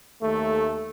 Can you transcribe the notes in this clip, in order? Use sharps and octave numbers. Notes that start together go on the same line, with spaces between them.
D#2 A3